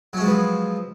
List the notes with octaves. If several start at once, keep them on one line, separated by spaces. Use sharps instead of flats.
F3 F#3 G#3 B3 C#4